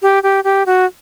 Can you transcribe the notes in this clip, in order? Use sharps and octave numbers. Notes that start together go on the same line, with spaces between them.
G4
G4
G4
F#4